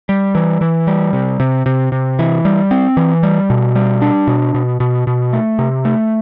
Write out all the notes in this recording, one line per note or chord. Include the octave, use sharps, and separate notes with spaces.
G3
E3
E3
G3
C3
C3
C3
C3
E3
G3
C4
E3
G3
B2
G3
D4
B2
B2
B2
B2
A3
C3
A3